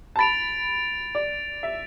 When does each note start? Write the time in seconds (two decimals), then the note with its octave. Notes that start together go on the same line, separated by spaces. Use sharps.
0.16 A5
0.19 B5 A6 D7 F7
1.15 D5
1.63 E5